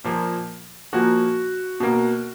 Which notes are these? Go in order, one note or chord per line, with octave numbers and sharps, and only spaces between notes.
A#2 F3 A#3
A#2 F3 A#3 F#4
B2 A#3